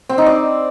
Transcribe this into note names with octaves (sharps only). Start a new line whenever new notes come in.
C4
D#4
D5